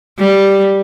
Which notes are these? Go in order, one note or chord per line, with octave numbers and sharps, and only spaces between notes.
G3